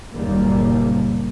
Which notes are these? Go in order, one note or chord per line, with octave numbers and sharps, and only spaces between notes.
F#1 D#2 A#2 G3 A#3